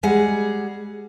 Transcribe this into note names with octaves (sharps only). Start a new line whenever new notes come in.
G3 G#3 G#4 F#5